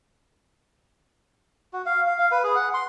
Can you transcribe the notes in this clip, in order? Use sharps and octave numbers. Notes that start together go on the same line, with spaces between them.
F#4
F5
F5
F5
B4
G#4
F#5
C6